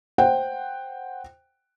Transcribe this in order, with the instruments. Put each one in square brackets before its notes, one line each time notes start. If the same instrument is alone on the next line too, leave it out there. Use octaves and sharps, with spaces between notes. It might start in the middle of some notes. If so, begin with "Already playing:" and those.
[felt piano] C5 F#5 G5